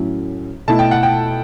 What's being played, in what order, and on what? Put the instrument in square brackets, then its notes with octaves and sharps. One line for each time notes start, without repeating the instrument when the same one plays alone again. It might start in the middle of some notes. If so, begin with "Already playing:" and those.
Already playing: [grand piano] A2 F#3 A3 C#4 E4
[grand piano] B2 A3 E4 [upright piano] A5
[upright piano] G5
F#5
G5